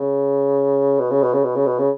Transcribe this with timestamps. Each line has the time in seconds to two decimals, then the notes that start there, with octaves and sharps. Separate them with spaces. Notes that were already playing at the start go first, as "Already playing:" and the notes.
Already playing: C#3
0.99 B2
1.11 C#3
1.22 B2
1.33 C#3
1.44 B2
1.55 C#3
1.66 B2
1.78 C#3